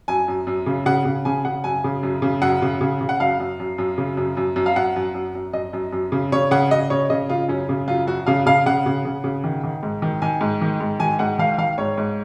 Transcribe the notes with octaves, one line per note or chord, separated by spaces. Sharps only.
F#2 G#5
F#2
F#2
C#3
C#3 F#5
C#3
C#3 G#5
C#3 F#5
F#2 G#5
C#3
F#2
C#3
F#2 F#5
C#3
C#3
C#3
F#5
F#2 F5
F#2
F#2
F#2
C#3
F#2
F#2
F#2
F5
F#2 F#5
F#2
F#2
F#2
F#2 D#5
F#2
F#2
C#3
C#3 C#5
C#3 F#5
C#3 D#5
C#3 C#5
C#3 D#5
C#3 F4
F#2 C#4
C#3
F#2 F4
F#2 F#4
C#3 F5
C#3 F5
C#3 F#5
C#3
C#3
C#3
D#3
D#3
G#2
D#3
D#3 G#5
G#2
D#3
G#2
D#3 G#5
G#2 F#5
D#3 F5
D#3 F5
G#2 C#5
G#2